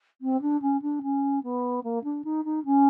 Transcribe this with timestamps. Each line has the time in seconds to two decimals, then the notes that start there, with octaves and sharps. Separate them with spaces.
0.21 C4
0.41 D4
0.62 C#4
0.82 D4
1.02 C#4
1.43 B3
1.83 A#3
2.04 D4
2.24 D#4
2.45 D#4
2.65 C#4